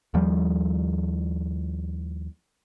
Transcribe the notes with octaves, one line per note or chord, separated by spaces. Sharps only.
D#2 F3 G3